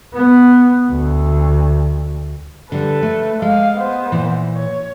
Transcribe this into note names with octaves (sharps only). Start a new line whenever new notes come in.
B3
D2
D3 G3 A4 B4
A3
G#3 F5
B3 C5
A#2 E3
C#5